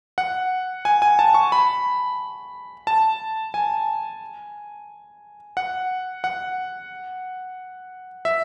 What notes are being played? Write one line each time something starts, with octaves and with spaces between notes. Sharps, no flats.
F#5
G#5
G#5
A5
C#6
B5
A5
G#5
F#5
F#5
E5